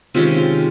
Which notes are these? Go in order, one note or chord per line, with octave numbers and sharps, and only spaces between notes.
C3 D#3 G#3 C#4 F4
F4